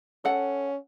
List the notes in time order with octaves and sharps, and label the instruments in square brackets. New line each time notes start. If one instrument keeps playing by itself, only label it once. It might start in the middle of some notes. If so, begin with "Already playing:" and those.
[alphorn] C#4 [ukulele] A4 F#5